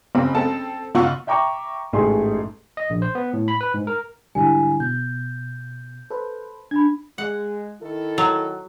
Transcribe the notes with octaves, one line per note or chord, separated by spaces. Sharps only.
F#1 C4
C4 A4 A5
F#1 F4 F#5 C#6 E6
E5 G5 A#5 C#6 D6
A1 G#2 A3 G#4 C6
D#5
A#1
C5
B3
A2
B5
B4
G#2
A#4
G#2 D3 G3 E4 G#5
B2 G6
A4 B4 C5
D4 B5 G#6
G#3 F#5
D#3 E4 A4
F#3